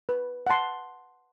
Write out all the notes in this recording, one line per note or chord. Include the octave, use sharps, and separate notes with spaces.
B4
F#5 A5 C6